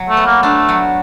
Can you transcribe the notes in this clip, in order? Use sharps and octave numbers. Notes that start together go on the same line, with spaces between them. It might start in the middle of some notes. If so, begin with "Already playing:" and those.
Already playing: F#3
A3
B3
A#3
A3 D4
F#3